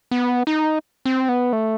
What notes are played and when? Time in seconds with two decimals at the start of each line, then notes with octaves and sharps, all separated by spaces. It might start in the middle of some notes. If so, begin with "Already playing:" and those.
0.11 B3
0.47 D#4
1.06 C4
1.29 B3
1.53 A3